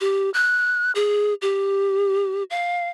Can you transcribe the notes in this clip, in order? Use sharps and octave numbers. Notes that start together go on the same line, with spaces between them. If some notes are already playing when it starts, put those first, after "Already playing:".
G4
F#6
G#4
G4
F5